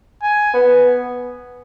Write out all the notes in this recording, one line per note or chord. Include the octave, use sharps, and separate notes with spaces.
G#5
B3